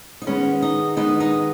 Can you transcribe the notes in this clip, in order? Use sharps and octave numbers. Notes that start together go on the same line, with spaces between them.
D#4
D#3 G#3 B3 C#4
D#4
D#3 G#3 B3 D#4
D#4